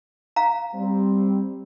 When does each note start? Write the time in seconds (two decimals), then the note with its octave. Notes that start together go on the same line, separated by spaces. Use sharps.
0.36 F5 A#5
0.74 G3 C4